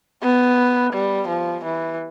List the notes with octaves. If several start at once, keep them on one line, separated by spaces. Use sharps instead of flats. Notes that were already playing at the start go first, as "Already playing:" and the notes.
B3
G3
F3
E3